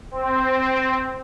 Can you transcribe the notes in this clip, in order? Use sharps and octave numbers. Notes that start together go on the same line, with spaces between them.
C4